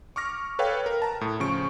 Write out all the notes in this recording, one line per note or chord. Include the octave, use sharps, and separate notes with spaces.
C#6 D6 F6 A#6
A4 B4 C#5 F5 G5
A#4
A5 A#5
A2
C#3 F3 C#6 D7